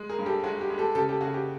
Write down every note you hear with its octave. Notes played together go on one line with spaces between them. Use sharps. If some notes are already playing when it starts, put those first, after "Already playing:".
Already playing: G#3
G#4 A#4
G2
G4 A4
G#3 F#4 G#4
G4
G#3
G4 A4
C#3 G4 A4
G4 A4
C#3 F#4 G#4
G4